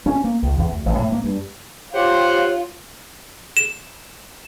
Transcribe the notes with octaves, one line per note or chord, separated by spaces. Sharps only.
C#4
A#3
C#2
E2
D2
A1
A2
A#3
G2
F4 G4 C5 C#5 F#5
E7